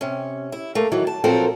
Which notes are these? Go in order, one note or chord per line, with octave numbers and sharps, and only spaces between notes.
C3 C#4
E4
A3 A#3
D#3 E3 F#3
A5
A#2 F3 F#3 C4 A4 A#4